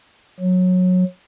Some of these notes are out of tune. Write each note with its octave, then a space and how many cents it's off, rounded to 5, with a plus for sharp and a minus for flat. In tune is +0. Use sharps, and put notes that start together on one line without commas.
F#3 -20